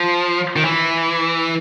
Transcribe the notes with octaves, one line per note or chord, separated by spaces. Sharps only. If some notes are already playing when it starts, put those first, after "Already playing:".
Already playing: F3
D#3
E3